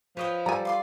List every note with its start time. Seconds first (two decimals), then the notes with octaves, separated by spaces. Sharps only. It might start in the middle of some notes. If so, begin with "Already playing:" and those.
0.17 F3 B4 C#5 D#5 G5
0.46 G3 A4 G#5 A#5
0.65 F4 D5 C6